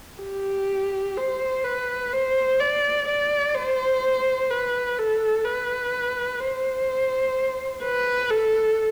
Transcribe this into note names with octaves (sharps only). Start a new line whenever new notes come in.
G4
C5
B4
C5
D5
D5
C5
B4
A4
B4
C5
B4
A4